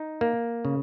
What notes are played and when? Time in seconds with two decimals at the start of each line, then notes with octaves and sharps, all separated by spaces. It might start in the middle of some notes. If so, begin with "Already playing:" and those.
Already playing: D#4
0.21 A#3
0.65 C#3